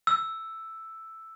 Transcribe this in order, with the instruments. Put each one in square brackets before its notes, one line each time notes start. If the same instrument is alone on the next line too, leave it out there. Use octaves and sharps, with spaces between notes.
[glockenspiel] E6